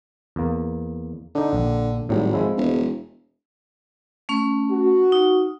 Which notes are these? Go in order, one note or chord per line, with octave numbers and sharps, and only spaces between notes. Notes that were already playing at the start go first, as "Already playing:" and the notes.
E2 A#3
D3 D4 D#4
A#1
G#1 A2 F#3 G3
F3 G#3 E4
E1
A3 C#4 C#6
F#4
D#4